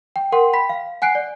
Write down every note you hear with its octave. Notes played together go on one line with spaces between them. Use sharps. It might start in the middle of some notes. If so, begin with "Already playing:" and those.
G5
A#4 F#5 G5 C6
G5 B5 B6
F5
F#5 G#5 F#6 C7 D7
D5